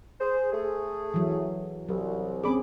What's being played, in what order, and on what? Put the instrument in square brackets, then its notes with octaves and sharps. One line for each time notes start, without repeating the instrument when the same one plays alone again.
[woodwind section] G#4 C5
A3 G#4
[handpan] E3 F#3
[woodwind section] C2 [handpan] F#3
[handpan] C4 C#4 G#4 [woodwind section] B5 D6